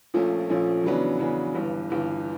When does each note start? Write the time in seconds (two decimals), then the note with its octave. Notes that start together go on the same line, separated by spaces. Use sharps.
0.14 A#1 A#2 F3 A3 C#4
0.49 A#1 A#2 F3 A3 C#4
0.84 E2 C#3 F#3 B3 D4
1.19 E2 C#3 F#3 B3 D4
1.55 G1 G2 E3
1.90 G1 G2 E3